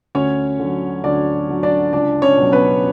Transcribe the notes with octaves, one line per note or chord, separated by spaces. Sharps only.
D2 C#4 C#5
D3 F#3
D2 D4 D5
D3 F#3
D4 D5
C#2 D4 D5
C#4 C#5
B2 F#3
B3 B4